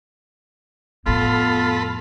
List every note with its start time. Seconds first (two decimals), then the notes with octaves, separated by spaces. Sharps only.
1.06 F2 A2 B3 F4 A4 B5